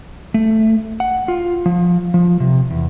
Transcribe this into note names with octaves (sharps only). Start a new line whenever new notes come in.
A3
F#5
F4
F3
F3
C3
E2